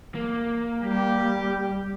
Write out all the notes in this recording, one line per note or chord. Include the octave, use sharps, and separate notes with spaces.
A#3
G3 G4